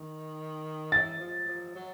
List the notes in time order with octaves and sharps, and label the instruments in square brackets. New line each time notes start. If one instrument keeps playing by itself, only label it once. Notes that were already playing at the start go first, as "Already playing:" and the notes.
Already playing: [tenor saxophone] D#3
[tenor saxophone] E3 [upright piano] A6
[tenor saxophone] F3
F3
F#3